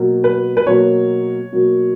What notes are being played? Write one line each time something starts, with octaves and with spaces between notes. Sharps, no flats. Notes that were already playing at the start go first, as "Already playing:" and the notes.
Already playing: B2 F#3 A#3
B4
B4
B2 F#3 A#3 C#5
B2 F#3 A#3